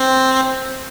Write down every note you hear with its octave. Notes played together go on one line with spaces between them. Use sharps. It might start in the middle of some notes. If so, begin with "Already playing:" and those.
Already playing: C4